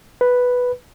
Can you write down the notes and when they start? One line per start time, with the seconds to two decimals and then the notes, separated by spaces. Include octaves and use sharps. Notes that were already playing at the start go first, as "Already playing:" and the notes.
0.21 B4